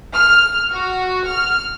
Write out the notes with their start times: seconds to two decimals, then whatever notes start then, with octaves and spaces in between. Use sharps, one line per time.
0.15 F6
0.73 F#4
1.28 F6